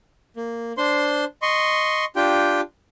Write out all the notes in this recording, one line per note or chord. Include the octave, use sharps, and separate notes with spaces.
A#3
D4 C5 C6
D#5 C6 C#6
D4 F4 G4 G5